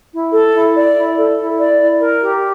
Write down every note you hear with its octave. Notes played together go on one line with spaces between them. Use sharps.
E4
A4
E4
D5
E4
A4
E4
D5
E4
A#4
G4